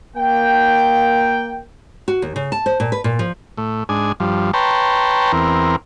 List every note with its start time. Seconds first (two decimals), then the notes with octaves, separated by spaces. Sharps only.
0.16 A#3 G5
2.08 F#4
2.22 D#2
2.36 C#3
2.52 A5
2.66 C5
2.80 A#2
2.92 B4
3.04 A#2
3.19 F3
3.58 A2
3.89 G#2 D4 G#5
4.20 G2 F3
4.54 B4 C#5 G5 A5 A#5 C6
5.32 E2 C4 A#4